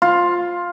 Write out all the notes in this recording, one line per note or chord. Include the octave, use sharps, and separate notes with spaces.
F4